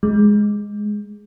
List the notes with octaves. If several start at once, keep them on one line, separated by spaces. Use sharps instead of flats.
G#3